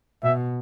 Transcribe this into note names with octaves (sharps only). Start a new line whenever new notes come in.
B2 E5